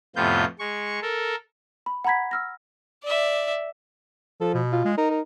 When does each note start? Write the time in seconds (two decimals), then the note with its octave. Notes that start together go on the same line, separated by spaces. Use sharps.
0.16 F2 A2 C3 B3 F4 G6
0.59 G#3 C#6
1.02 A4 A#4
1.86 B5
2.05 F#5 A#5 B5 G#6 B6
2.31 E6 F6 A#6
3.03 D5 E5
4.41 F3 A4
4.54 B2
4.73 F4
4.85 G#3
4.98 D#4 A#4
5.10 A#4